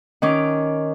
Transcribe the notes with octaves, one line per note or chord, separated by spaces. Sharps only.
D#3 C#4 D6